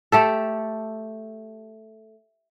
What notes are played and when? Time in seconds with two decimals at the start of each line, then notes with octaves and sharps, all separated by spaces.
0.12 A3 G4 A4